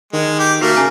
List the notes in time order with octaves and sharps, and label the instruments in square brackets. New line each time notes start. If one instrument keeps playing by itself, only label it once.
[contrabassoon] D#3 [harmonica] G#3
[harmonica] G4
[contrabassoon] D#2 [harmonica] A3 A#3 [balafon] F#4 A4 A#4
[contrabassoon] C#3 [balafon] A#4 G#5 A#5